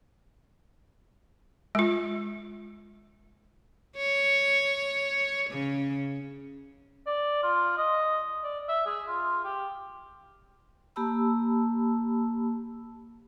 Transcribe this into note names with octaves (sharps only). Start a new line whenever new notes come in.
G#3 F4
C#5
C#3
D5
F4
D#5
D5
E5
G#4
F4
G4
A#3 G4 A5 B5 E6